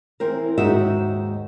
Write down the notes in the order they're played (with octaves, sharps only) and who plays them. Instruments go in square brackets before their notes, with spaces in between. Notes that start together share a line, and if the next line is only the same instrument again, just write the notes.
[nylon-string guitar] E3 C4 A#4
D#2 G#2 G#3 D#4 F#4 E5